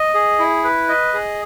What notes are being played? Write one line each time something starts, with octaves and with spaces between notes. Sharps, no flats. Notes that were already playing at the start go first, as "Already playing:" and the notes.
Already playing: D#5
G#4
E4
B4
D#5
G#4